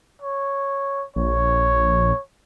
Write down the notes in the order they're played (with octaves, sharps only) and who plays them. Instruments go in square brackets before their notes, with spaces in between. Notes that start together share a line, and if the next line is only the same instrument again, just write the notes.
[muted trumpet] C#5
[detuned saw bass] A#1 [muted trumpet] C#5